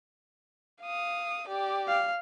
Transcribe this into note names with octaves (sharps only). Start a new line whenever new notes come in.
F5 D#6
G4 D5
F5